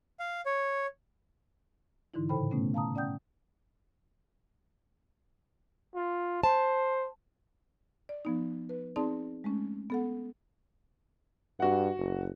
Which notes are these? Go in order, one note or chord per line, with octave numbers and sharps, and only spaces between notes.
F5
C#5
G#2 D3 E3 D#4 E4
A2 C#3 A4 C5 G5 B5
B2 A3 B3 C#4
F5 A5 A#5 D#6
C#4 D5 F#5 G5 D#6 G6
F4
C5 A5
D5
F3 B3 D#4
B4
C4 D#4 G#4 D5 A5 C6
G#3 A3 C#4
B3 A4 F#5
G2 F#4 F#5
F#1